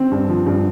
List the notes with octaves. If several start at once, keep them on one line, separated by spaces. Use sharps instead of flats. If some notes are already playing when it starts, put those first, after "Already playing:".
Already playing: C4
G2
F3
G2